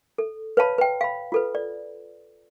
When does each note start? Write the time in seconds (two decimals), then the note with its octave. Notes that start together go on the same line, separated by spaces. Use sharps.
0.18 A4
0.57 B4 C#5 F5 A5 B5
0.78 B4 G5
1.01 F5 B5
1.32 F4 A4 B4
1.55 D5